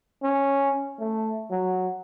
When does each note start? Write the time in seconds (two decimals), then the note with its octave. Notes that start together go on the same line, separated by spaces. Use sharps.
0.23 C#4
1.00 A3
1.51 F#3